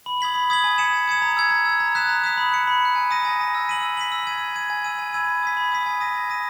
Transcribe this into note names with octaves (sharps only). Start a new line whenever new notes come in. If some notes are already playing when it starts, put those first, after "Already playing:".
B5
D#6 G#6 B6 F#7
B5
D#6 G#6 B6 F#7
G#5
D#6 G#6 C#7 E7
G#5
D#6 G#6 C#7 E7
A#5
E6 G#6
A#5
E6 G#6
A#5
D#6 F#6 B6 E7
A#5
D#6 F#6 B6 E7
B5
F#6 C#7
B5
F#6 C#7
G#5
D#6 A#6 D#7
G#5
D#6 A#6 D#7
E6
B6 D#7 F#7
E6
B6 D#7 F#7
E6
G#6 D#7
E6
G#6 D#7
G#5
B5 E6 G#6 D#7
G#5
B5 E6 G#6 D#7
B5
D#6 G#6 B6
B5
D#6 G#6 B6
G#5
D#6 A#6 D#7
G#5
D#6 A#6 D#7